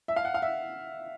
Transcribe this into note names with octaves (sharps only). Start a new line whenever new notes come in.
E5
F5
F#5
F5
E5